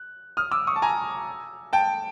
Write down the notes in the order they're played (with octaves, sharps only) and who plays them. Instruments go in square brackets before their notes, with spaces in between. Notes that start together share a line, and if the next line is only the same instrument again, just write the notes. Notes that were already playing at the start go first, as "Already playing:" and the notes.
Already playing: [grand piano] F#6
D#6 F6
D6 E6
C#6 D#6
A5
G#5 A#5
G5 A5